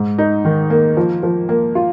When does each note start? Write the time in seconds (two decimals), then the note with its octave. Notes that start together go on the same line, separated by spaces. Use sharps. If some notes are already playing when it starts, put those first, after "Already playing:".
Already playing: G#2
0.18 D#4
0.45 D#3
0.70 A#3
0.97 F3
1.23 F3
1.49 A#3
1.75 F4